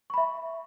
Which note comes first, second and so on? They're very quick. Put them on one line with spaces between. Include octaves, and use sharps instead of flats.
C#6 B5 E5